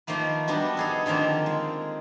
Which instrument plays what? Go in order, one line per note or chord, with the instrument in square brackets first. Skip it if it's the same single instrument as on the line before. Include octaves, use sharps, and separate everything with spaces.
[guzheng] D#3 F3 A3 A#3 B4
G3 B3 D4 F#4
D#4 G#4 A4
D3 D#3 F3 A#3 C4
G#3